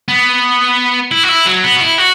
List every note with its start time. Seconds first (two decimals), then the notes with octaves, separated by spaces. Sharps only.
0.08 B3
1.11 E4
1.23 F#4
1.29 E4
1.46 F#3
1.64 B3
1.76 F#4
1.81 E4
1.98 F#4